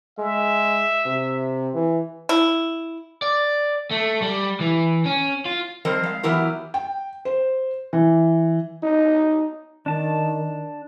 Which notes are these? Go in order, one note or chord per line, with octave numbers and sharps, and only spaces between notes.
G#3 E5
C3
E3
E4
D5
A3
G3
E3
C#4
F4
F3 G3 C4 A#4 C5 D#5
G#3 F5
E3 F#3 B3 E4 G4 A#4
G5
C5
E3
D#4
D#3 D4 A5